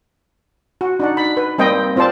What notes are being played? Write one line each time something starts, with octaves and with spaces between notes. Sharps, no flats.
F#4
D4 D#4 F#5
B5
B4
G3 A#3 C4 D#5 G5
C4 F4 C5 D5 A5